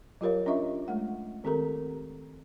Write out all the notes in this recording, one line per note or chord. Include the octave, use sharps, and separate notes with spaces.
F#3 F4 G4 A#4 C#5 F5
C#4 D4 F4 D#5 E5 C#6
G#3 A3 F#5
D#3 C4 G4 A4 A#4 A#5